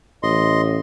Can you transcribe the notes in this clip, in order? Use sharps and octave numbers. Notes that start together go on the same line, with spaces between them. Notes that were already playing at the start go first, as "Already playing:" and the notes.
A1 D#5 C6